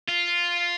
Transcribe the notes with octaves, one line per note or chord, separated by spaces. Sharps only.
F4